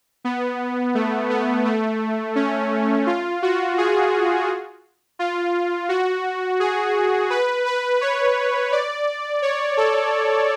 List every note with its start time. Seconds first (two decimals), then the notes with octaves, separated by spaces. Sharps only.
0.25 B3
0.95 A3
1.30 B3
1.65 A3
2.36 C#4
3.07 F4
3.43 F#4
3.78 G#4
5.19 F4
5.89 F#4
6.60 G#4
7.30 B4
7.66 B4
8.01 C#5
8.72 D5
9.42 C#5
9.77 A4